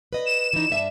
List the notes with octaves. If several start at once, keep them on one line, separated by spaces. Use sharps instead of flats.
B4 D#5
E7
E3 D#4
G2 D4 E5